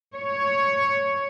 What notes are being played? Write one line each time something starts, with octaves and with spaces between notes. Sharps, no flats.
C#5